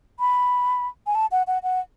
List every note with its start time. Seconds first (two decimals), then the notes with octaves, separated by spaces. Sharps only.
0.20 B5
1.07 G#5
1.15 A5
1.31 F#5
1.47 F#5
1.63 F#5